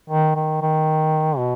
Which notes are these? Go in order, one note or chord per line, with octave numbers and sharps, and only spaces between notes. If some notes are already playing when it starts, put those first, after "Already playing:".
D#3
D#3
D#3
B2